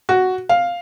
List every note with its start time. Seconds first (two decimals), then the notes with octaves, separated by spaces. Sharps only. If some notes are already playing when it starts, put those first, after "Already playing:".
0.09 F#4
0.49 F5